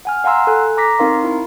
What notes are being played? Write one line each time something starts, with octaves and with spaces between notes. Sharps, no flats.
F#5 G#5 F6
F5 F#5 G#5 A#5 C6 E6
A4 G#5 F#6
A#5 D6 A#6 B6
C4 D#4 A#4 F5 C6
E4